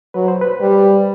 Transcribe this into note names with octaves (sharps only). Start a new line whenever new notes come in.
F#3 B4
C5
B4
G3